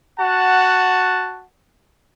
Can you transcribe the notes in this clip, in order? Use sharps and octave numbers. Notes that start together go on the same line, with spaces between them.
F#4 F#5 A5